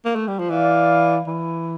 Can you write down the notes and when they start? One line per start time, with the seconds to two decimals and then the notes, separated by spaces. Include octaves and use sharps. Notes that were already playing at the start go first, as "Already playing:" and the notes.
0.05 A#3
0.16 A3
0.28 G3
0.39 F3
0.50 E3 D5 F5
1.27 E3